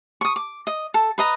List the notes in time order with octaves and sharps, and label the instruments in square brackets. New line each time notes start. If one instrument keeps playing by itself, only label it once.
[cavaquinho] C#6 D#6
D6
D#5
A4
B4 D#5 A#5